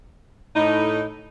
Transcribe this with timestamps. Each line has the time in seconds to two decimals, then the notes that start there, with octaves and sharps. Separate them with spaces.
0.56 A2 D#4